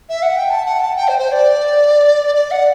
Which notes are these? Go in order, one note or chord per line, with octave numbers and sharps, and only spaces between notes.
E5
F#5
G5
A5
F#5
A5
G5
C5
C5
D5
D5
F#5